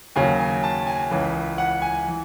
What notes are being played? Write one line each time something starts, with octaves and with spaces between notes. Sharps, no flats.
D#2 C#3 F#3 G#5
G#5
A5
G#5
C#2 C#3 E3
F#5
G#5
E3